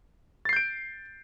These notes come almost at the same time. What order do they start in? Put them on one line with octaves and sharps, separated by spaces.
A6 C7 G6 D7